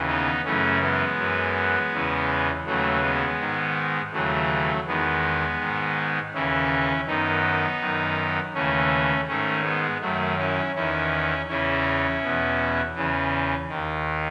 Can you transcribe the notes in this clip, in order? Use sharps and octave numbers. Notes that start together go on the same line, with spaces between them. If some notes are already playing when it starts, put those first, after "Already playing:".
Already playing: D#2 C#3 E3
B3 D#4
F#2 C#3 E3 A3 C#4
G#3 B3
F#2 E3
E2 C#3 E3
D#2 C#3 E3 F#3 A3
G#3 B3
G#2 D#3
D#2 C#3 E3 F#3 A3
E2 D#3 G#3 B3
G#2 D#3
D#2 C#3 E3 C#4 E4
F#2 D#3 B3 D#4
F#2 D#3
D#2 C#3 E3 A3 C#4
G#2 D#3 A3 C#4
G#3 B3
F#2 D#3 F#3 A3
C#4 E4
E2 D#3 C#4 E4
E2 C#3 E3 C#4 E4
E2 B2
E2 C#3 E3
D#2 D#3